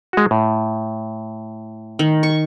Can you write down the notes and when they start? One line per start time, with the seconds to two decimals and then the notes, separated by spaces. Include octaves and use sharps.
0.13 G#3 F#4
0.31 A2
1.99 D#3
2.23 C#6